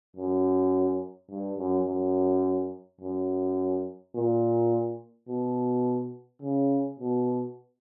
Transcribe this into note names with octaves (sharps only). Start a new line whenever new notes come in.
F#2
G2
F#2
F#2
F#2
A#2
B2
C#3
B2